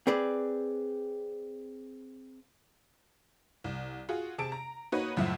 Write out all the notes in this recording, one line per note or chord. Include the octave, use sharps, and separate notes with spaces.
C4 G#4 B4 D5
C2
F4 F#4 G#4
C3 G#4 A5 D7
A#5
A#3 D#4 F#4 B4 C#5
C#2 F#2 A2 F3 E5 F#5